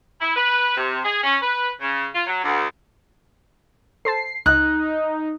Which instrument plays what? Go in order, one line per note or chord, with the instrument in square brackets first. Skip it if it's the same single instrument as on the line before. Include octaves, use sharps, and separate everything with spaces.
[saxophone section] E4
B4
C3
G#4
C#4
B4
C#3
F4
F#3
D2
[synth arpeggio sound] A4 C5 A5 [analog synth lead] C7
[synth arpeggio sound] C#2 D#5 [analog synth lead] D#4 [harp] F#6